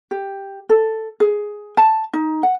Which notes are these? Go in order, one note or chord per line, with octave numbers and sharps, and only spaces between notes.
G4
A4
G#4
A5
D#4
F#5